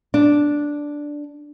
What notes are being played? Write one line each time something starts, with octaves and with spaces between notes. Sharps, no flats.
D4